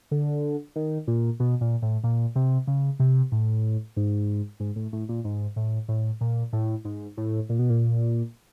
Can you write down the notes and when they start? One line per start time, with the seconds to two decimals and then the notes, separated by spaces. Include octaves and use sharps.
0.11 D3
0.76 D#3
1.07 A#2
1.40 B2
1.61 A#2
1.82 A2
2.04 A#2
2.36 C3
2.67 C#3
3.00 C3
3.32 A2
3.97 G#2
4.60 G#2
4.76 A2
4.93 A2
5.09 A#2
5.24 G#2
5.56 A2
5.88 A2
6.21 A#2
6.53 A2
6.85 G#2
7.17 A2
7.49 A#2
7.59 B2
7.70 A#2